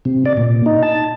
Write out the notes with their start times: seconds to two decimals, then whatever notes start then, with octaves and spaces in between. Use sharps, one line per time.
0.05 C3
0.26 D5
0.37 A#2
0.66 D#4
0.82 A5